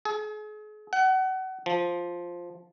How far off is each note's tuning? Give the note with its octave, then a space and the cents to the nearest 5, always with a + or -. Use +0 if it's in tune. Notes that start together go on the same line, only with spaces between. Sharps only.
G#4 +40
F#5 +30
F3 +0